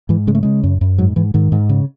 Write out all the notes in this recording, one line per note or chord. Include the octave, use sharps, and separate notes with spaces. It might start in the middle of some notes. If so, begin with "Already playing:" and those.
G#2 E3
C#3 G#3
A3
C#3 G#3
F#2
F#2
G#2 F#3
G#2 E3
G#2 D#3
G#2
C#3